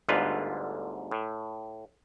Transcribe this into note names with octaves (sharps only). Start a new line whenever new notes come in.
G1 D2 G#2 D3 F4 B4
A2